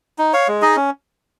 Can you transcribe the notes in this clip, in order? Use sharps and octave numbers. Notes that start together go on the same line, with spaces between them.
D#4
C#5 F5
G#3
D#4 G#4 D#5
C#4